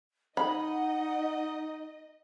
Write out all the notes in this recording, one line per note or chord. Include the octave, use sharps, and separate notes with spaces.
D#4 D#5 F#5 B5